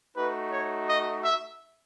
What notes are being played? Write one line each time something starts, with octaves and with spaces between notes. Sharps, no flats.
A3 D#4 F#4 B4
C#5
D#5
E5